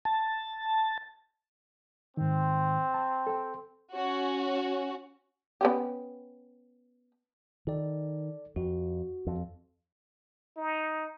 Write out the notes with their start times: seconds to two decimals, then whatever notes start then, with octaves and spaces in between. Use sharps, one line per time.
0.05 A5
2.17 G#2 D#3 C4
2.94 A5
3.27 A4 G5
3.93 C#4 F#4
5.61 B3 C#4 G4
7.67 D#3 A4 D5
8.56 F2 F#4
9.27 F2
10.57 D#4